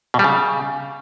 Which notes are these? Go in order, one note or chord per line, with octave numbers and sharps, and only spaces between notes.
B2
G3
C#3